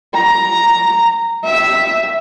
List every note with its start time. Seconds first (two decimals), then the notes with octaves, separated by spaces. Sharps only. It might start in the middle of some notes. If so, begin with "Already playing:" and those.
0.14 A#5
1.44 E5